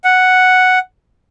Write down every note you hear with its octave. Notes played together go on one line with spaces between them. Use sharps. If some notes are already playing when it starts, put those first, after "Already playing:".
F#5